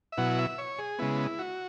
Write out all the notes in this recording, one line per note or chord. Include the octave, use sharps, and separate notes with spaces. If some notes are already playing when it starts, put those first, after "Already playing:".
E5
B2 F#3 E4 F#5
E5
C#5
G#4
C#3 G#3 B3 E4
F#4